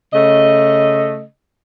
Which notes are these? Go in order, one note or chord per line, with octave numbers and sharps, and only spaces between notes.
C#3 A3 D#5